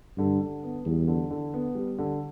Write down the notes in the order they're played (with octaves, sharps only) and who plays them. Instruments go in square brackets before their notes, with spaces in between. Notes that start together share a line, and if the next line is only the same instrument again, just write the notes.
[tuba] G2 [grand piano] D3
[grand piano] D3
B3
[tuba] E2 [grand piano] G3
[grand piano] D3
D3
B3
G3
D3